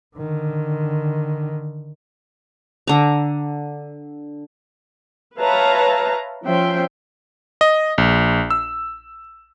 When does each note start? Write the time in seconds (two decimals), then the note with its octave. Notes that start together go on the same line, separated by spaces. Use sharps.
0.16 D3 D#3
2.87 D3 A#5
5.39 B4 C#5 E5 F5 A5 A#5
6.45 F3 C#4 E5 G5 C6
7.61 D#5
7.98 A#1
8.50 E6